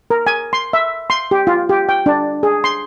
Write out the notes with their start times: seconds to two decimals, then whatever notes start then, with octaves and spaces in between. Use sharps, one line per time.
0.10 A#4
0.27 G#5
0.53 C6
0.73 E5
1.10 C6
1.31 G4
1.47 F4
1.69 G4
1.89 G5
2.06 D4
2.43 G#4
2.64 C6